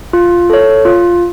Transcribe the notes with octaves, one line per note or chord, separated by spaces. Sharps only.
F4
A4 C#5
F4